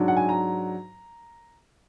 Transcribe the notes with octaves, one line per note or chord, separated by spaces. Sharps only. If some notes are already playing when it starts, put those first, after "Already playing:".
Already playing: G#2 F#3 D4
F#5
G#5
A#5